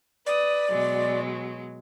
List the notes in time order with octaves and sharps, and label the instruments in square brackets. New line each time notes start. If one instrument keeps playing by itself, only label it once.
[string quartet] B4 D#6 [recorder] D5
[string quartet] B2 F#3 G#3